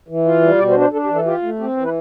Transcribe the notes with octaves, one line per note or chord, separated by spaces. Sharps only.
E3
F4
G3
B2 D5
C5
D4
C5
D4 A4
G4
E3
A4
F4 G4
A3
C4 G4
E3
B4